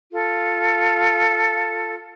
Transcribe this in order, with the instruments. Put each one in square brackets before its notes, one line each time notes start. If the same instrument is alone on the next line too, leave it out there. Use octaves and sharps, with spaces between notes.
[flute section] F4 A4